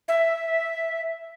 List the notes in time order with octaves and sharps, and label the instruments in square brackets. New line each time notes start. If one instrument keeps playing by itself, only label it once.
[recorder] E5